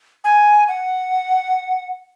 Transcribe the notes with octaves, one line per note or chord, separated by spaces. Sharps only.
G#5
F#5